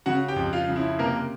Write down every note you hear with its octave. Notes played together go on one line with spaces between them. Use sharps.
C#3 F#4 F#5
G4 G5
F2
F4 F5
C#3
E4 E5
C3 A#3 A#4